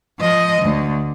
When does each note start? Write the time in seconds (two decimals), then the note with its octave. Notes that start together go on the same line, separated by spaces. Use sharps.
0.20 F3 D#5
0.63 D2